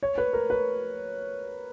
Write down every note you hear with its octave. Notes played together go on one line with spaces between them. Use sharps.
C#5
B4
A#4
B4